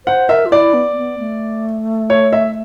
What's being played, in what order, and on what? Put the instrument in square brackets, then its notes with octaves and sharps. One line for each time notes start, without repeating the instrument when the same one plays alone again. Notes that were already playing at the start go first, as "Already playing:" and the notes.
[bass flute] C5 [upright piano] F#5
[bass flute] A#4 [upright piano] E5
[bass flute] F4
[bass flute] E4 [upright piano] D5
[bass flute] B3
B3
A3
[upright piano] C#5
E5